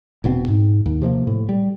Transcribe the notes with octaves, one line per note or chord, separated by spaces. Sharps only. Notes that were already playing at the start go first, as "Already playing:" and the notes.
E1 B2 B3 C4
G#2
D#2
C3 F3 G#3 A#3
A2
G3